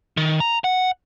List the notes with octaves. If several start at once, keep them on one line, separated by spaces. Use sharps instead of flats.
D#3
A#5
F#5